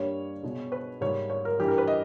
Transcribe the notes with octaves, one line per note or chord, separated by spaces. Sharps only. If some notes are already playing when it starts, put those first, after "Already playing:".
Already playing: G2 G3 A#3 C#5
B2 G#3
B4
G#2 G3 A#3 C#5
C#5
A#4
G2 E3 G3 G4
A#4
B4
D#5